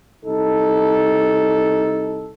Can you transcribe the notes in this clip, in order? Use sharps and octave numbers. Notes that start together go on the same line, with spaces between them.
C2 D#4 A4